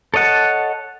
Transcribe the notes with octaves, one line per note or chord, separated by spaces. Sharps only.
A4 C#5 D#5 F#5 A5